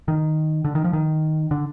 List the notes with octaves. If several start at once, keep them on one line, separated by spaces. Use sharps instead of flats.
D#3
D3
D#3
F3
D#3
D3